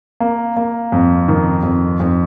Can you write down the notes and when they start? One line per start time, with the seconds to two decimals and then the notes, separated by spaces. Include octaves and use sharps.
0.20 A#3
0.57 A#3
0.92 F2
1.28 D#3
1.63 F2
2.00 F2